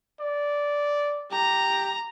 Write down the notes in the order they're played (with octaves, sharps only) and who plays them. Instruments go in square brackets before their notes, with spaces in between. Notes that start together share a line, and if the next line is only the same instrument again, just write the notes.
[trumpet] D5
[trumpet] G4 [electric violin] A#5